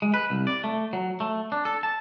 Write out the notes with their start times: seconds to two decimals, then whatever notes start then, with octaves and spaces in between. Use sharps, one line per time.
0.02 G#3
0.14 B4
0.30 C2
0.47 D5
0.64 A3
0.93 F#3
1.20 A3
1.52 D4
1.65 A4
1.83 A5